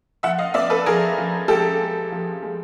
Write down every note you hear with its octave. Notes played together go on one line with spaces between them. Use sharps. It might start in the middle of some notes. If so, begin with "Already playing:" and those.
F3 E5 F#5
D#5 F5
B3 D5 E5
A4 B4
F3 G#4 A#4
F3
G#3 G4 A4
G#3
F3
G#3